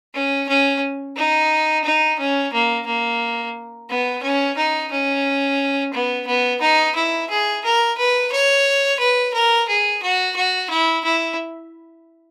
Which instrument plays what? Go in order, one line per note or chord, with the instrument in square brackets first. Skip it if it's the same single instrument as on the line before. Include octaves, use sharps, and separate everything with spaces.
[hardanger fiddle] C#4
C#4
D#4
D#4
C#4
A#3
A#3
B3
C#4
D#4
C#4
B3
B3
D#4
E4
G#4
A#4
B4
C#5
B4
A#4
G#4
F#4
F#4
E4
E4